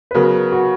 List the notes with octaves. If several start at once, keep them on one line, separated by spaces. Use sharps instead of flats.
B4
C#3 F#3 B3 F#4 A#4
F#4